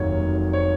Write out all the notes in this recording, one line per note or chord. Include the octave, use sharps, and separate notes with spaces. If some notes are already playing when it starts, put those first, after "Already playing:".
Already playing: F1 D#2 D#3 F#3 C#5
C#5